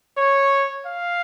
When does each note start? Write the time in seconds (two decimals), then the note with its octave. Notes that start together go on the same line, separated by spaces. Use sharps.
0.17 C#5
0.86 F5